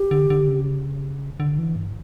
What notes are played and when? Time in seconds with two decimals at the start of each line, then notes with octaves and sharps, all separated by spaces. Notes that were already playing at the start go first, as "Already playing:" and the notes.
Already playing: G4
0.11 D3
0.30 D3
0.48 C#3
1.40 D3
1.58 E3
1.76 G2